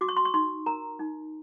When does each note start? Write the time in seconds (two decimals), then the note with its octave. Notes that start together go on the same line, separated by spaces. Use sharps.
0.01 F#4 D6
0.09 C#6
0.17 C6
0.25 C#6
0.34 D#4 C6
0.66 A#4 A#5
0.99 D#4